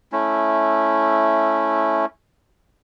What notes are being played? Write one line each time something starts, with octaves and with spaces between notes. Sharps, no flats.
A3 C#4 E4